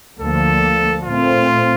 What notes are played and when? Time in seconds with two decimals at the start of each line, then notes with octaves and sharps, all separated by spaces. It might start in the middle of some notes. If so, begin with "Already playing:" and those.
0.20 D2 D3 F3 A#3 A4
1.04 A#2 A3 C4 F4